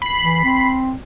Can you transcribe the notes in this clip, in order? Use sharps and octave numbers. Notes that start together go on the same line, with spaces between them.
B5 C7
E3
C4